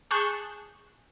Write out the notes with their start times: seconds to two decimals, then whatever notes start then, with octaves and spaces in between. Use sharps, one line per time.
0.11 G#4 A5 C#6 F#6 G6